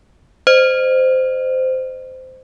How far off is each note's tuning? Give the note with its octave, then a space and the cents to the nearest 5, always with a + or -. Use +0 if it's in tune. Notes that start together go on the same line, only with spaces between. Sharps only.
C5 -15 D#5 -30